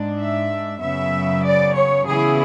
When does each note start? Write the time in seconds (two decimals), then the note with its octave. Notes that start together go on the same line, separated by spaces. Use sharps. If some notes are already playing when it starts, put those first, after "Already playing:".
Already playing: G#2 G#3 D4
0.18 E5
0.81 F#2 C#3 F#3 B3 E5
1.44 D5
1.75 C#5
2.06 C#3 E3 B3 E4 G#4